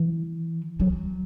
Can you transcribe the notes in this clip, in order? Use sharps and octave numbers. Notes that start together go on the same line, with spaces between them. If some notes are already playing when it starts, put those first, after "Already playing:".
Already playing: E3
F#3